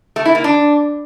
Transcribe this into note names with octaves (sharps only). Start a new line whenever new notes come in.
A3
E4
A#3
D4